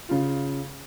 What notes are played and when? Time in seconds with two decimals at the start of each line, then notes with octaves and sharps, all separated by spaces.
0.09 C#3 F4